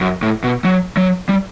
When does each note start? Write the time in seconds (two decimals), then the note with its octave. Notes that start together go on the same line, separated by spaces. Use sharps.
0.01 F#2
0.22 A2
0.44 B2
0.64 F#3
0.97 F#3
1.29 G3